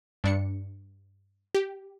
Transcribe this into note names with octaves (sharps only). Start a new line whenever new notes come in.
G2 D4 C#7
G4